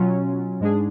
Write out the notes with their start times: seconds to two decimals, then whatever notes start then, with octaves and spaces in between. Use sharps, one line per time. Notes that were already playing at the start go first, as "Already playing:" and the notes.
Already playing: B2 F#3 C#4 F4
0.60 G#2 G#3 D4 G#4